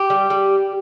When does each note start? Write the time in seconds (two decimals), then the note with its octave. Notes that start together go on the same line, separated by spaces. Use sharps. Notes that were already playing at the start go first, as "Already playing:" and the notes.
Already playing: G4
0.10 G3
0.30 G3